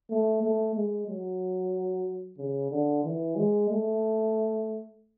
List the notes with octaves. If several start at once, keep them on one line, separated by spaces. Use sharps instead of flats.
A3
A3
G#3
F#3
C#3
D3
E3
G#3
A3